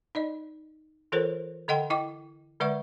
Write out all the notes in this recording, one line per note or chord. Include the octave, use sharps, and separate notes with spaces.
D#4 D5 D#5
E3 F4 A4 A#4 C5 C#5
D3 A4 D#5 F#5 G5 C6
E4 D#5 G5 D6
D3 G#3 B4 D5 F#5 C#6